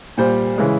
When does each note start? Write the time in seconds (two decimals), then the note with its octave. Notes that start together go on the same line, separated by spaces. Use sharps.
0.18 A#2 G3 C5
0.58 C#3 E3 G#3